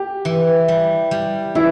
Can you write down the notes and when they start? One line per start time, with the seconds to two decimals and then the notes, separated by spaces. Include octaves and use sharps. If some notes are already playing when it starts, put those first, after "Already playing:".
Already playing: G4
0.25 E3
0.68 G3
1.11 G3
1.55 E3 E4